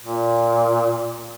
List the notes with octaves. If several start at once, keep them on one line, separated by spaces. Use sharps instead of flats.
A#2